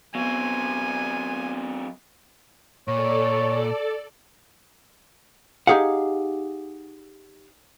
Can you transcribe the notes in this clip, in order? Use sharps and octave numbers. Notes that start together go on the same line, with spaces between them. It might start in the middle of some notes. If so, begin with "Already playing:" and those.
F#3 B3 C4 G#5
A#2 A4 C#5 D5
D#4 G4 G#4 F5 F#5